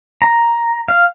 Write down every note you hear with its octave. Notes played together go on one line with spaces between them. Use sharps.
A#5
F5